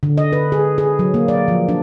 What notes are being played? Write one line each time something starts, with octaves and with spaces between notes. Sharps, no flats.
D3
D#5
B4
G#4
G#4
F#3
A#3
D5
F3
D4